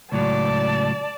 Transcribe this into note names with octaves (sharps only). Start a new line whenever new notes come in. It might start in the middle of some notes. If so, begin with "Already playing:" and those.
C#2 A2 F#3 D5 A5